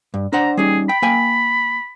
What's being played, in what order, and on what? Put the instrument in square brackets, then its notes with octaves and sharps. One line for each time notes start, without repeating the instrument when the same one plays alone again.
[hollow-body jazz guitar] G2
[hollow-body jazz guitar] D4 C5 F#5 [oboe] A#5
[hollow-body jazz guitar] G3 C#4 D#4 [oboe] G#4
[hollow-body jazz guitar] G5 [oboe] B5
[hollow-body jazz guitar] A#3 G5 G#5